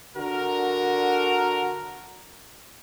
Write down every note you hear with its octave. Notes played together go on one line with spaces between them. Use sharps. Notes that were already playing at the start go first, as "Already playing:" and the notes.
D3 F#4 A#4